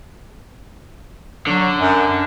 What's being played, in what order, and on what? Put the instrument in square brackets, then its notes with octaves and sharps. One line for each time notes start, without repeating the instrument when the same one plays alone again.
[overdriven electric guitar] D3 [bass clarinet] F#3
[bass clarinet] F#2